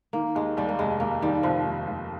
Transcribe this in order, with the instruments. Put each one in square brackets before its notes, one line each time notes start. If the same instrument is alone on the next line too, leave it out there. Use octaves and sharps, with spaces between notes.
[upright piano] D#3 [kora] A#3
[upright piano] D#2 [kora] G#3
[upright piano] D#2 [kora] G3
[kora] A#3
[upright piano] F1 [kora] G#3
[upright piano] D#2 [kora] A#3
[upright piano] D#3 [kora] G3
[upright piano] F1 [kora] F3
[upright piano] D#2
D#2